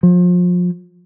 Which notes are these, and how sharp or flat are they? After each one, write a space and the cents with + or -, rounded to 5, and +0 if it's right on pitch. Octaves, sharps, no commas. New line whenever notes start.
F3 +30